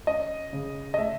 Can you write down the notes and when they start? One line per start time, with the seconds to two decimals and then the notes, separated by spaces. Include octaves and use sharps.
0.07 C#4 D#5
0.53 C#3
0.94 D#5
0.98 A3 E5